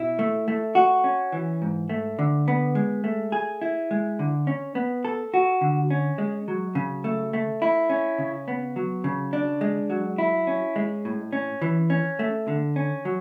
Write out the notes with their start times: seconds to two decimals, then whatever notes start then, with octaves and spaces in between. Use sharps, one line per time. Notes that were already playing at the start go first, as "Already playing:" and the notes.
Already playing: B2 E4
0.19 A3
0.48 A3
0.75 F#4
1.04 C#4
1.32 E3
1.62 G#2
1.89 A3
2.19 D3
2.48 B3
2.75 G#3
3.04 A3
3.32 G#4
3.61 E4
3.91 G#3
4.19 D3
4.47 C#4
4.75 B3
5.05 A4
5.34 F#4
5.61 D3
5.90 C#4
6.18 G#3
6.48 F#3
6.75 C#3
7.04 A3
7.33 A3
7.62 E4
7.90 C#4
8.18 C#3
8.48 B3
8.76 F#3
9.04 C#3
9.33 D4
9.61 G#3
9.90 F#3
10.18 E4
10.47 C#4
10.76 G#3
11.05 A2
11.33 C#4
11.62 E3
11.90 C#4
12.19 A3
12.48 D3
12.76 C#4
13.05 F#3